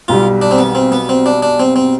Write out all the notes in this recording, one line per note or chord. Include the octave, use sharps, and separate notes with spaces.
B1 B2 G3 F4
D4
C4
B3
C4
B3
C4
D4
D4
C4
C4